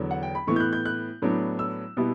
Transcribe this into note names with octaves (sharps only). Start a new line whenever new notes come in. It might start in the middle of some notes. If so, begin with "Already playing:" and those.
Already playing: E2 D3 F#3 B3
F#5
G5
B5
A2 E3 B3 C#6
G6
F#6
G6
F#6
A2 F#3 B3 D4
E6
B2 G3 B3 E4